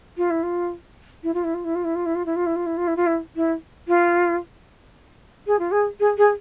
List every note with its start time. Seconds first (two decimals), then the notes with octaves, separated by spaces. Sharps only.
0.17 F4
0.30 E4
0.43 F4
1.23 E4
1.34 F4
1.44 E4
1.54 F4
1.64 E4
1.75 F4
1.84 E4
1.95 F4
2.06 E4
2.15 F4
2.25 E4
2.36 F4
2.46 E4
2.56 F4
2.66 E4
2.77 F4
2.87 E4
2.96 F4
3.06 E4
3.36 E4
3.88 F4
5.46 G#4
5.59 F4
5.71 G#4
5.99 G#4
6.17 G#4